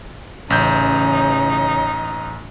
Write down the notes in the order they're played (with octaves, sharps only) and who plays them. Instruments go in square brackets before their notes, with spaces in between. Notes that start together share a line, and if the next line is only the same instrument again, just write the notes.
[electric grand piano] A1 G6 [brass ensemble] C#3 E3 C#4 [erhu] D#4